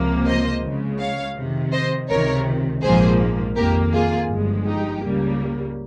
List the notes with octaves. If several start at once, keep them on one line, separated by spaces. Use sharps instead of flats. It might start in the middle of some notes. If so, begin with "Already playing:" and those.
Already playing: C#2 C3 F3 A#3
C5 D#5
C#2 C#3 G#3
C#5 F5
F2 C3 D#3
C5 D#5
C#2 C3 D#3 A#4 C#5
A#1 G#2 F3 A#3 G#4 C5
F2 D#3 A#3 G4 A#4
F4 G#4
G1 G2 F3 G#3
D#4 G4
C#2 C#3 G3 A#3